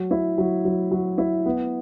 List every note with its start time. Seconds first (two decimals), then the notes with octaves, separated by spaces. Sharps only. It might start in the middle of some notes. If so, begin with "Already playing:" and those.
Already playing: F#3
0.11 E4
0.38 F#3
0.65 F#3
0.91 F#3
1.18 E4
1.46 B3